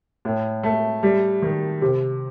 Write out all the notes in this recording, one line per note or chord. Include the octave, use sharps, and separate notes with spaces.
A2
A3
G3
D#3
C3